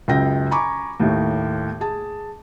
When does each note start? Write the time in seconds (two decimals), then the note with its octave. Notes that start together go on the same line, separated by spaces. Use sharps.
0.08 C#2 F#2 G5 A#6
0.51 G#5 A#5 B5 C#6 D6
1.00 D#2 A2
1.81 G#4 A5